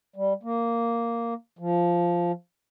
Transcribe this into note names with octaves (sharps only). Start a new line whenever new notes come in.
G3
A#3
F3